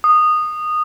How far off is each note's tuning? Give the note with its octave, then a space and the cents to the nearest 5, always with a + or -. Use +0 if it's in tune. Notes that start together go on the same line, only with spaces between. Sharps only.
D#6 -15